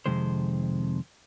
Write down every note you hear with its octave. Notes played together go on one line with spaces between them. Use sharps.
F2 C3 D#3 G#3 C5